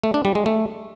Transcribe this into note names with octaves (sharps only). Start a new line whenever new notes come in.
A3
D4
G3
G#3
A3